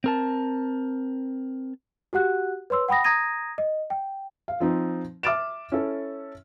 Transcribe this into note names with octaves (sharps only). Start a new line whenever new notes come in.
C4 A#4 A5
F#4 G4 F#5 F#6
B4 C#5 C6 E6
F#5 G5 B5 D#6 A#6
A#5 D#6 G#6 A#6 D#7
D#5
G5
F5
F3 C4 D#4
E5 D6 F6 A6 D7 E7
C#4 E4 A4